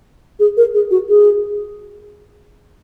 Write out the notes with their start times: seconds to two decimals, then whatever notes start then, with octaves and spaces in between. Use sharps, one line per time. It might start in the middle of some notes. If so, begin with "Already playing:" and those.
0.40 G#4
0.57 A#4
0.74 G#4
0.91 F#4
1.09 G#4